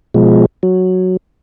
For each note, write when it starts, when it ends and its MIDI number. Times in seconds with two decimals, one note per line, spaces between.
0.14 0.46 47
0.14 0.46 53
0.14 0.46 56
0.63 1.17 54